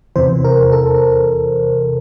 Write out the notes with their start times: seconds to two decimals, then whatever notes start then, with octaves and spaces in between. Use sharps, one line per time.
0.16 E2 C3 E3 C5
0.45 A#4
0.72 A4